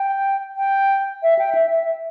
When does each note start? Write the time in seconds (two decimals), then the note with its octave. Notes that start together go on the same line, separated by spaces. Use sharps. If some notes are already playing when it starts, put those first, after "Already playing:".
Already playing: G5
0.57 G5
1.23 E5
1.39 G5
1.55 E5
1.72 E5